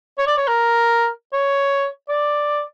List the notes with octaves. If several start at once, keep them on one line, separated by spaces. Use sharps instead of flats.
C#5
D5
C#5
A#4
C#5
D5